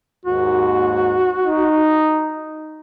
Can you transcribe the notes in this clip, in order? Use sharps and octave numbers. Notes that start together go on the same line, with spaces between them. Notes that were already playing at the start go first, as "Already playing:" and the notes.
D#2 G#2 F#4
D#4